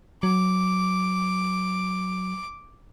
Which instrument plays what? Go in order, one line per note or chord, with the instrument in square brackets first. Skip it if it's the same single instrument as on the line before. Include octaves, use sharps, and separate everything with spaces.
[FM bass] F#3 [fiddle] D6